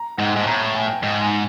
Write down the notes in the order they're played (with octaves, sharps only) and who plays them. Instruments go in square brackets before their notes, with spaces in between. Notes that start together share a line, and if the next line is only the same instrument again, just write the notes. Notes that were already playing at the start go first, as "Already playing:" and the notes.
Already playing: [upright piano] A#5
[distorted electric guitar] G#2 [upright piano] F#5
[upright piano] G5
G#5
[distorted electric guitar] G#2 [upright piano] A5
[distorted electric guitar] A2 [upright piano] A#5
[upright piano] A5
G#5
G5
[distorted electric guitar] G#2 [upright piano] G5
[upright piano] G#5